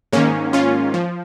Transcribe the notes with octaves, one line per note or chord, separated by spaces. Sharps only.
G#2 D#3 A#3 C#4
C#4 F4
F3